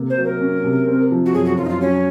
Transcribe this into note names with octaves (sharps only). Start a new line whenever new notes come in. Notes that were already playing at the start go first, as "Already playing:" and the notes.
Already playing: C3 A#3
C5
F#3
A#4
C#4
C3
C4
F3
F#4
F#2 G#4
F#4
F#2 F4
D#4
F4
F#3 C#4